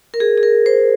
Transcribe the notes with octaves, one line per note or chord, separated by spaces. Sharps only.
A#4
G#4
G#4
A#4
C5